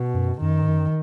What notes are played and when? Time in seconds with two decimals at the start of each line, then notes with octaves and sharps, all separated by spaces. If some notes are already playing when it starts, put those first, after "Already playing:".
Already playing: B2
0.14 F#2
0.41 F#2 D#3
0.62 G#2
0.68 F#2